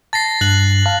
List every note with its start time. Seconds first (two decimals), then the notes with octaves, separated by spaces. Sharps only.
0.13 A5 A6 A#6 C7
0.41 G2 F#6 F#7
0.86 F5 A5